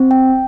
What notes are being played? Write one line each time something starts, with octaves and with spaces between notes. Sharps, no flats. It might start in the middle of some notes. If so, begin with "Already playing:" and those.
Already playing: C4
G5